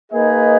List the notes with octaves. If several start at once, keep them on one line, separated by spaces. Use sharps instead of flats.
A#3 D#4 G#4 B4 D#5